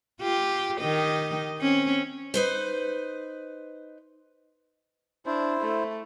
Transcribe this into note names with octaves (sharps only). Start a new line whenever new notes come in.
F4 G4
D#3 G4 D#5
C4 C#4
D#4 B4 C5
D4 E4 C5
A3